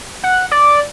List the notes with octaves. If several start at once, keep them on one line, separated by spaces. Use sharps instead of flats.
F#5
D5